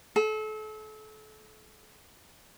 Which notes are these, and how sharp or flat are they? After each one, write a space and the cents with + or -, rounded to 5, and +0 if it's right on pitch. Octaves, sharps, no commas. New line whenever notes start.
A4 -35